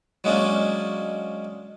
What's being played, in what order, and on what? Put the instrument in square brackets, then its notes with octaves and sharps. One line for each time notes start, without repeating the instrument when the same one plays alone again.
[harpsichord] F#3 G#3 A#3 C#4 D4